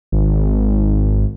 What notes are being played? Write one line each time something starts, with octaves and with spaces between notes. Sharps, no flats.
G#1